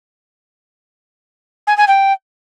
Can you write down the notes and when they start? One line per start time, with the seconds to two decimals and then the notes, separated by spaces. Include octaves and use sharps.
1.67 G#5
1.77 G#5
1.88 G5